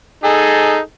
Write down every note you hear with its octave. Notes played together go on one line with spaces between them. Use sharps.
D#4 G#4 A4